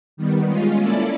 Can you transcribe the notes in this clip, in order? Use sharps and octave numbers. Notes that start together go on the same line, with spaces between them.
D#3 G3 B3
G#3 C#4 F4
A#3 C#4 E4 A4 D5